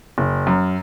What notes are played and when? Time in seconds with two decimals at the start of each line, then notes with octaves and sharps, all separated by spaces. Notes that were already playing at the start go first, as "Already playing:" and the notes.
0.18 F#1
0.47 F#2